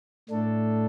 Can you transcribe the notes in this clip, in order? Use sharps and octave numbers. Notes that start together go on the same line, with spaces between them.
A2 A3 D4 A4